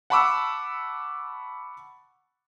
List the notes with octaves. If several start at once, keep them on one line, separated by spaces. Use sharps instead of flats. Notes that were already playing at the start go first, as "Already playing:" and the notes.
F#5 A5 B5 C#6 D6 E6